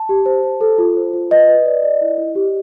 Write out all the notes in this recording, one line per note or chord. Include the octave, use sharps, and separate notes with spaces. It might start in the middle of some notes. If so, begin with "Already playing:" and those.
Already playing: A5
G4
C5
C5
A4
F4
C5
F4
B4 D#5
B4
D5
D5
E4
E4
G4